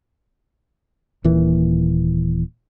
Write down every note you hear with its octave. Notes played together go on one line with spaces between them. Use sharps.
D#1 A#2 E3